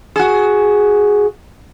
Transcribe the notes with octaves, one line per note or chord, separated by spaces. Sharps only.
F#4 G#4